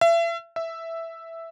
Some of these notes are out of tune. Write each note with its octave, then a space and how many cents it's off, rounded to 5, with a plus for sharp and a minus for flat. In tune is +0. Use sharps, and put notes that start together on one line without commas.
E5 +35
E5 +0